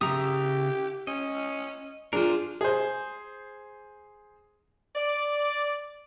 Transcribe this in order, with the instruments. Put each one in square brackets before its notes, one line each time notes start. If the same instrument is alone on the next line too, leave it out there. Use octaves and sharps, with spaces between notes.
[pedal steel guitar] C#3 A#5 D#6 [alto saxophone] G4 [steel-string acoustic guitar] E5
[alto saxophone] C#4 [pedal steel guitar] D#5
[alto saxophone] D4 [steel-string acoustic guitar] F4 G#4 [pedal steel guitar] A#4 C5
[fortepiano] G#4 C5
[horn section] D5